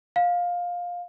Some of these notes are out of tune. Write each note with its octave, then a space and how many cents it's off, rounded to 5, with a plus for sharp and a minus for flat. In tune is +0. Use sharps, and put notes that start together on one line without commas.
F5 +15